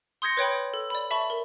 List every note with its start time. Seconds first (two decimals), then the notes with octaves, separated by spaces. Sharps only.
0.22 C6 D#6 G6 G#6 A#6 C#7
0.37 B4 C#5 G5 B5
0.74 A4
0.90 D5 B5
1.11 E5 A5 B5 C#6
1.30 A#4